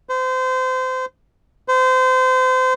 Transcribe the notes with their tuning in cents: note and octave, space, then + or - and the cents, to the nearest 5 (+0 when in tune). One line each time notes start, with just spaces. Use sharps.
C5 -30
C5 -30